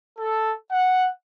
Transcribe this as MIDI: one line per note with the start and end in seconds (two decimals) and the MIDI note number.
0.19 0.54 69
0.71 1.09 78